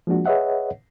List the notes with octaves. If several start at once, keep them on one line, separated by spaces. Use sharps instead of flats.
F3 G#3 A#3 D4 F#4
G#4 B4 C#5 D#5 E5 F#5